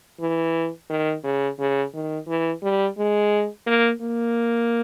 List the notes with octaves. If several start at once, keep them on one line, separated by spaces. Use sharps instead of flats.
E3
D#3
C#3
C#3
D#3
E3
G3
G#3
A#3
A#3